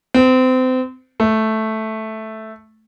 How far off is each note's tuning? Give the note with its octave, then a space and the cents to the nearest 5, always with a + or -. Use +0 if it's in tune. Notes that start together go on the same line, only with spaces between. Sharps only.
C4 -30
A3 -5